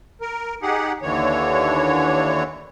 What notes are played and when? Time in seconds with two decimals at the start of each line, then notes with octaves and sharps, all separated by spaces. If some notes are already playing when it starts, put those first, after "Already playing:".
0.21 A#4
0.62 D#4 G4 G#4 F#5
1.02 D#2 D3 E3 C#5